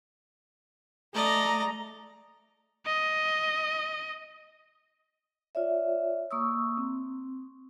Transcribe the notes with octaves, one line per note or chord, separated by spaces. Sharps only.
A3 D5 D#5 A#5
D#5
F4 C#5 D5 E5
A#3 C#6 D#6 E6
C4